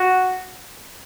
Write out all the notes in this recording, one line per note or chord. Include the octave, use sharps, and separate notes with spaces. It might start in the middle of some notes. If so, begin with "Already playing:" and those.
Already playing: F#4